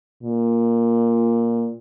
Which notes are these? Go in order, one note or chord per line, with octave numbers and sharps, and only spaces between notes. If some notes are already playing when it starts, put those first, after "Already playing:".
A#2